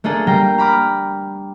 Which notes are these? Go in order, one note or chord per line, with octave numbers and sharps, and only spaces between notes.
A3 A#3 D4 G#4 A4
G3 A#3 G5 A#5 A#6 C7
A#5 B5 D6 F6